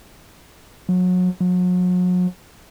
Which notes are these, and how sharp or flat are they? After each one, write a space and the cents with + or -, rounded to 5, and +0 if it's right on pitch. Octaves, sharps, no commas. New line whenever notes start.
F#3 -30
F#3 -40